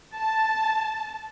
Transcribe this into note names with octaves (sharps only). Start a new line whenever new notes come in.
A5